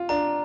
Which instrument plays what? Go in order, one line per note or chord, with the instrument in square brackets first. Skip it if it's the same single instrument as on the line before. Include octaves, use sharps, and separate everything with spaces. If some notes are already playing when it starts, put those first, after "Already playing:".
Already playing: [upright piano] F4
[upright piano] D4 [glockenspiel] A#5